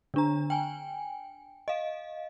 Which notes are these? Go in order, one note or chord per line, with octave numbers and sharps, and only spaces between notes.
D3 D4 A#5
G5 G#5
D#5 F5